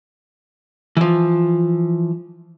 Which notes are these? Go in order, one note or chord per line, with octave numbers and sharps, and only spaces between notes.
E3 F3